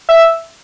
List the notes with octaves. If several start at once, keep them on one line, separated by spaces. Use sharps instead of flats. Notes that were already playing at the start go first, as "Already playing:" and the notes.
E5